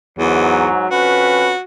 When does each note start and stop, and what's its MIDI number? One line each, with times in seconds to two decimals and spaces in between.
0.19 0.69 40
0.19 0.86 44
0.19 0.86 54
0.91 1.53 41
0.91 1.53 61
0.91 1.60 66
0.91 1.53 71